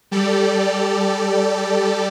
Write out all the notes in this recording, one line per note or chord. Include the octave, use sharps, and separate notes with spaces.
G3 G4 A4 D5